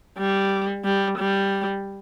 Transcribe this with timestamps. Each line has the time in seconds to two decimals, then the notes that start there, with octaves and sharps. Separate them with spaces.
0.18 G3
0.84 G3
1.18 G3